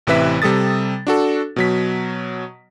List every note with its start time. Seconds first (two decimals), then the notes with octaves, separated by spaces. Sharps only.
0.07 A1 C3 E3 B4 E5 B6
0.42 C3 G3 A4 D#6 A6
1.07 D4 F#4 A4
1.56 B2 F#3 B6